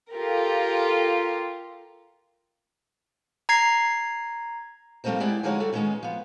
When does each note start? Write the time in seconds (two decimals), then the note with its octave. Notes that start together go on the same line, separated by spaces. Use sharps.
0.12 F4 G4 A4 A#4
3.49 A#5 G#6 C7
5.04 F3 G3 A3 A#3 C4 D#4
5.20 G#3 E4 G4 D5 F#5
5.43 D3 F3 G#3 D#4 F#4 C#5
5.60 G3 F#4 A4
5.73 D#3 G#3 A3 B3 C#4 D#4
6.03 F3 B3